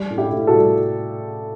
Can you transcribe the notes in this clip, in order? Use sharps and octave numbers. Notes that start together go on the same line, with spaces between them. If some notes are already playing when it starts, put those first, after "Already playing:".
Already playing: G3
A2
E4 G4
A2
F#4 A4
G3